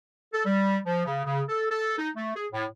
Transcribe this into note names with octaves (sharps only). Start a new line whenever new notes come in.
A4
G3
F3
C#3
C#3
A4
A4
D#4
A3
G#4
A2